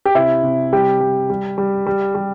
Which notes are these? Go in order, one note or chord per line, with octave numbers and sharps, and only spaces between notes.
G4
C3 E4
C3
G3 G4
G3
G3
G3
G3
G3